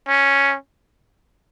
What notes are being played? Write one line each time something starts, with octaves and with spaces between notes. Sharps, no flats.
C#4